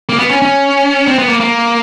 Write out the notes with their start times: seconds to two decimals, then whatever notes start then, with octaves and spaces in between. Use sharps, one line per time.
0.09 A#3
0.19 B3
0.30 C#4
0.42 C#4
1.08 C4
1.18 B3
1.29 A#3
1.40 A#3